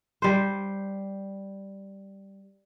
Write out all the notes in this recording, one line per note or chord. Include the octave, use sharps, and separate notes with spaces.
G3 C5